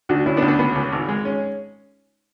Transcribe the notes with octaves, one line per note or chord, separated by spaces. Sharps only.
D2 D4 F#4
D2 C#4 E4
B3 D4
D2
B3 D4
C#2 B3
C#2
G#1
G#3
C#4